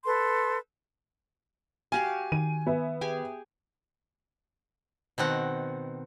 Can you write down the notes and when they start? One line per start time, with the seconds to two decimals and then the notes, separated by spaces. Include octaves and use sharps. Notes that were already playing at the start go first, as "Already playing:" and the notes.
0.05 A4 B4 C6
1.92 F#4 G4 F5 G#5
2.32 D#3 D#7
2.66 B3 E5
3.01 G4 G#4 G#5
5.18 B2 D#3 C4 F#5